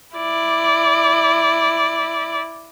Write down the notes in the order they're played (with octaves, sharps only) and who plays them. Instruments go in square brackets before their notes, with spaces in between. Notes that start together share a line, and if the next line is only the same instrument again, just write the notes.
[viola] E4 D5